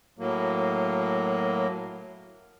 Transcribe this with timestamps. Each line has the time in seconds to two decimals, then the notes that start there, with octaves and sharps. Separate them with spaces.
0.19 A2 F#3 A#3